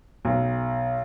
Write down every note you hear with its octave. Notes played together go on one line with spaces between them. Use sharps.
B1